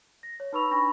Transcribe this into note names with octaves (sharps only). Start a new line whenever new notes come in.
A#6
C#5
D#4 B4 B5 C#6 E6 F7
D4 G#5 B5 C#6 A#6